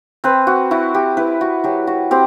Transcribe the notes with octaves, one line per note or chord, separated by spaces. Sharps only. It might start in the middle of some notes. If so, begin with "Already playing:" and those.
C4 B4
F#4
E4 F#4
G4
E4 B4
F#4
F#3 G4
F#4
C4 G4